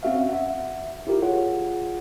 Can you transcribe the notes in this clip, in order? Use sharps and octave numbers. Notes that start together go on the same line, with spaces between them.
C4 C#4 F#4 E5 F5
E5 F#5
E4 F4 G4 A#4
F4 G#4 C#5 F#5